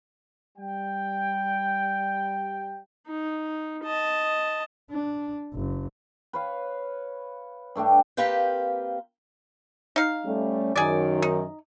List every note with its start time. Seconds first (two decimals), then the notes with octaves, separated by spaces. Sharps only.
0.58 G3 G5
3.08 D#4
3.84 D#5 A5
4.91 D4
5.53 F#1
6.33 B4 C#5 F5
7.75 G2 A3 D4 G4
8.17 A#3 C4 G4 B4 F5 G5
9.96 D#4 F5
10.25 G3 A3 C#4
10.76 F#2 D#3 G#4 D5
11.22 D#4